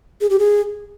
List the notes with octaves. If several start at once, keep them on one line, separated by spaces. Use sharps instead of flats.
G#4
G4
G#4